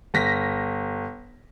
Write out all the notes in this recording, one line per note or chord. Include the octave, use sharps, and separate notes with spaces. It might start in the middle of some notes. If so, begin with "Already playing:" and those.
G1 A#6 B6